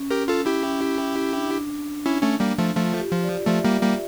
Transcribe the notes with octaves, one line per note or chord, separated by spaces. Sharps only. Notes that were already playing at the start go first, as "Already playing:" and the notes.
Already playing: C#4
G4 A#4
F4 A4
E4 G4
C#4
D4
C#4 E4
A3 C#4
G3 A#3
F3 A3
F3 A3 F4
G4
F3
D5
F3 A3 E5
G3 A#3
G3 A#3